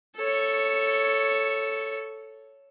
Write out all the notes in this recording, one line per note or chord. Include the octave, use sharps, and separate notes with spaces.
A4 C#5